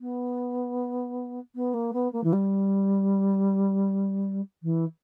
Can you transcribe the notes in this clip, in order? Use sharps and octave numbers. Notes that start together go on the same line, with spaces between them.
B3
B3
A#3
B3
A#3
E3
G3
E3